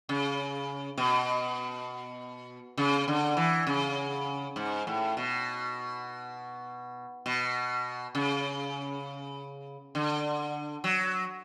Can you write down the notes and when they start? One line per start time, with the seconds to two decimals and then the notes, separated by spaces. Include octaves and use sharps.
0.09 C#3
0.98 B2
2.78 C#3
3.08 D3
3.37 E3
3.67 C#3
4.56 G#2
4.87 A2
5.17 B2
7.26 B2
8.15 C#3
9.95 D3
10.84 F#3